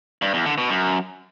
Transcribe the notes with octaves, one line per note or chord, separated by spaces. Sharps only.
G2
E2
D3
B2
F#2